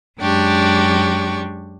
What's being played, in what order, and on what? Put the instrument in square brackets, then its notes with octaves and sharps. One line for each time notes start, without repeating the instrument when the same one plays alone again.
[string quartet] F#2 G#3 D4 G4 C#6